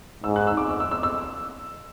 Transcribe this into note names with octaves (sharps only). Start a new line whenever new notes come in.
G#2 E6
F#6
E6
D6
E6
E6
E6
E6